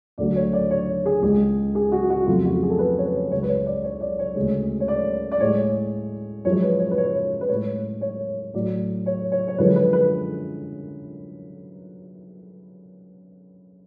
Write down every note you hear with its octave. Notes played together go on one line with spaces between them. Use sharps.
D2 D3 F#3 A3 D5
C#5
D5
C#5
G#4
C#2 C#3 G#3 G#4
G#4
F#4
F#4
F2 C#3 F#3 A3 F4
F#4
G#4
A4
B4
C#5
B4
C#2 C#3 F#3 C#5
B4
C#5
D5
C#5
D5
C#5
D2 C#3 G#3
C#5
D5
D5
A2 G#3 C#5
F#2 F3 G#3 C#5
B4
C#5
B4
C#5
B4
A2 G#3 C#5
C#5
A2 F#3 A3 D5
C#5
C#5
C#5
F#2 D3 F3 G#3 B4
B4
B4